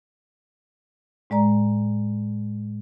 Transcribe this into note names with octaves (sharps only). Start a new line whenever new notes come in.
A2 G#3 D5 A#5